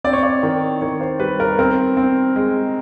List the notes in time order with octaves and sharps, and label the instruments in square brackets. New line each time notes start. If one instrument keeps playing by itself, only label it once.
[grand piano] C4 D5
C#5
D5
D#3
D#3 C#5
C5
G3 B4
A#4
C4 A#4
C4
G#3